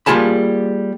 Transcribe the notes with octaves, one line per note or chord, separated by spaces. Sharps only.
G3 A#3 F4 G#4 A5 B5